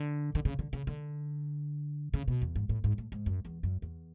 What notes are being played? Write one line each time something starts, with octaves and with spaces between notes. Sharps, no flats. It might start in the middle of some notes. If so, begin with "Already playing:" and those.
Already playing: D3
D3
C#3
D3
C#3
D3
C#3
B2
E2
G#2
A2
G#2
A2
G#2
F#2
E2
F#2
E2